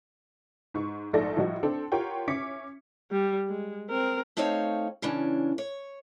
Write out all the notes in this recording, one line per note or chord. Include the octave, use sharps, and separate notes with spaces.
G#2 C#6
A#1 G#2 A3 A4 D5 A#6
A2 F3 G3 D#4 F#4
C4 D4 A4
F4 G4 A#4 C#5 F#5 G5
C#4 E5 D6 B6 C#7
G3
G#3
C4 A#4
A3 C4 D#4 C5 C#5 F5
C#3 E3 C#4 D4
C#5